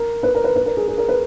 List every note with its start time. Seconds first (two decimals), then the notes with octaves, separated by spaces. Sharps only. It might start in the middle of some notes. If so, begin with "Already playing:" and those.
Already playing: A#4
0.23 B4
0.35 A#4
0.44 B4
0.56 B4
0.66 A#4
0.77 G#4
0.88 G#4
0.98 A#4
1.08 B4